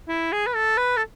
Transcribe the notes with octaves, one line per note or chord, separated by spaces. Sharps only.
E4
G#4
B4
A4
B4
A4